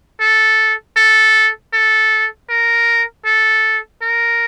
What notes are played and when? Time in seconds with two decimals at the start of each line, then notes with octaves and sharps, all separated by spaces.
0.20 A4
0.97 A4
1.73 A4
2.50 A#4
3.25 A4
4.02 A#4